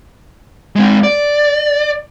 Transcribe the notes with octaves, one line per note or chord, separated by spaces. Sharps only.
G#3 C4
D5